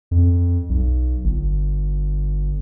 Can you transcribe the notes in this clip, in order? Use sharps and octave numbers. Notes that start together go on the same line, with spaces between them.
F2
B1
G1